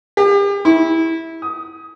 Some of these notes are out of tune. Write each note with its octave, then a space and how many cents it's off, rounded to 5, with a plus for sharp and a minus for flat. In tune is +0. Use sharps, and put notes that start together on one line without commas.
G4 +40
E4 -15
D#6 +20